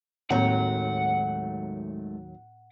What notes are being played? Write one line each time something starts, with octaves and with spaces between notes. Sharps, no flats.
D#2 A2 D#3 F#3 G#3 A3 C4 F#5